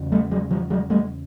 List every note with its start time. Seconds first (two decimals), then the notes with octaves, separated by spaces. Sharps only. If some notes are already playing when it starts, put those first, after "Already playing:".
Already playing: E2 C#3
0.12 G3 A3
0.31 F#3 G#3
0.51 F3 G3
0.70 F#3 G#3
0.90 G3 A3